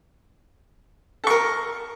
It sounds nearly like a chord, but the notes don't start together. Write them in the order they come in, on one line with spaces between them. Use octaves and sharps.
A4 C#6 A#4